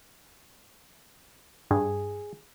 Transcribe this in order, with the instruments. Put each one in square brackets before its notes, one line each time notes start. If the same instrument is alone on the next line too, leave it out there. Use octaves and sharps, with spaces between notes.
[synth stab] G2 [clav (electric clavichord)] G#4